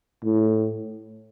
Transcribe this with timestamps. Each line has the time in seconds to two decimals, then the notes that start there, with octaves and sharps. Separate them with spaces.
0.24 A2